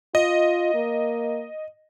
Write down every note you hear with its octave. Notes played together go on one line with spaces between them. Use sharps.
F4 D#5
A#3